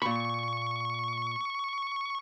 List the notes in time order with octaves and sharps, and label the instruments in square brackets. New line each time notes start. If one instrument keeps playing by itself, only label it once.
[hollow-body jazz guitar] A#2 B5 [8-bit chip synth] C#6